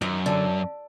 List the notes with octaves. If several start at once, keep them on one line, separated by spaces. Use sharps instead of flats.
F#2 D#3
D3